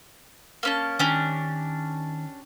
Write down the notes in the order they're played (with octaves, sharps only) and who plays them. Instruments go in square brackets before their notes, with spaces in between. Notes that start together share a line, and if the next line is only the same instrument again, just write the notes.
[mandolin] A#3 C#4 A5
[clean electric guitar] D#3 G#5 [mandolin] C#4 D4 G4